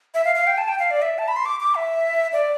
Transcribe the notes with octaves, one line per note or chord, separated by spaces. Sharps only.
E5
F5
F5
G5
A5
G5
F5
D5
E5
A5
B5
C6
D6
D6
E5
D5